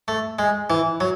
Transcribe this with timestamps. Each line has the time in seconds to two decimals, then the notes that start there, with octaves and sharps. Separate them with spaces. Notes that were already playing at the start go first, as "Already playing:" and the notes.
0.08 A3
0.39 G#3
0.70 E3
1.00 F#3